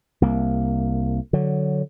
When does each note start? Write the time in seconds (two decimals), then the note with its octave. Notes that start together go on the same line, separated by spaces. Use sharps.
0.22 C2 A#3
1.33 D3 F#3